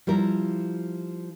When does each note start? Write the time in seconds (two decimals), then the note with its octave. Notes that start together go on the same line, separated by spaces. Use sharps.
0.07 F3 G3 E4 A#4